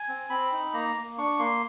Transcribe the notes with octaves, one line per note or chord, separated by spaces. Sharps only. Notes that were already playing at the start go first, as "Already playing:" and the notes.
Already playing: G#5
C4
C4 B5
D#4
A#3 A#5
A#3
D4 C#6
A#3 C6